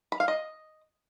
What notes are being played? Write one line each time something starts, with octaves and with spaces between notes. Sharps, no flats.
B5
F5
D#5